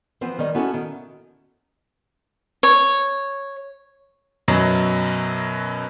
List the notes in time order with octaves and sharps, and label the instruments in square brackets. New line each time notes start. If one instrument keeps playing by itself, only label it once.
[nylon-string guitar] E3 F3 B3 C4
D#3 G3 C#5 D#5
B3 C#4 E4 F#4 A4
D#3
[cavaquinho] C#5
[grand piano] F#2 B2 F#3